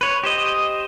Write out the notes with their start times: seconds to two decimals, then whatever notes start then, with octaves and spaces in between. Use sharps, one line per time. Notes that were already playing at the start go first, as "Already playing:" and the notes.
0.01 B4 C#5
0.23 G4 C5 D#5